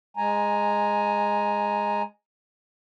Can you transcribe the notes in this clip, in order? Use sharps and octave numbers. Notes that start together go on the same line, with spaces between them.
G#3 G#5 A#5